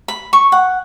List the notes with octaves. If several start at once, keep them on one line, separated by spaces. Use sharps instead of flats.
B5
C#6
F#5